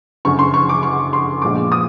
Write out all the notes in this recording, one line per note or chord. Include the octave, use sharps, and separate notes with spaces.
F#1 F#2 D3 C#6
C6
C#6
D6
C#6
C6
A#1 A#2 F3 G#3 B3 D6
D#6